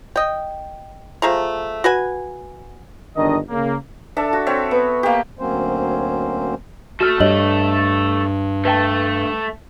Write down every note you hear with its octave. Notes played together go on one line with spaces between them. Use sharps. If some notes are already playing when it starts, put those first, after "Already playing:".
D#5 G5
F3 A3 G#4 A#5
F#4 B4 G#5
G1 G#2 D#3 D4 D#5
C#3 A#3
D4 A4 E5
F#4
C4 C#5 E5
B3
A#3 G4
D2 F#3 A#3 C4 C#4 C5
A3 F#4 A4 F6
G2 C#5 D#5 F#7
A3 B4 G5 A5